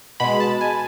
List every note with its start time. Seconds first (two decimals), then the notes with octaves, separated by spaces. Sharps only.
0.20 B2 G#3 B5
0.40 A5
0.61 G#5